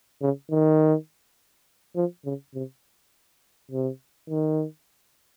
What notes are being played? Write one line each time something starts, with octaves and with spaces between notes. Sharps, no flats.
C#3
D#3
F3
C#3
C3
C3
D#3